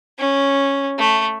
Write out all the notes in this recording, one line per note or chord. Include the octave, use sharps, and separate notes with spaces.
C#4
A3